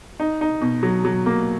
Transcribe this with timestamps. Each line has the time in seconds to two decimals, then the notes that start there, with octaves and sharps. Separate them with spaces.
0.20 D#4
0.41 D#4
0.61 B2
0.83 F#3
1.05 F#3
1.26 A#3